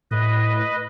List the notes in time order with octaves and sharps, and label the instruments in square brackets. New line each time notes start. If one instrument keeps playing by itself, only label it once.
[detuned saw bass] A2 [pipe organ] B4 D#5